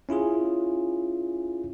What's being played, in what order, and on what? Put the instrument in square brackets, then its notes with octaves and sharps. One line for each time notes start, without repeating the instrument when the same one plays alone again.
[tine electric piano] C#4 E4 F4 G#4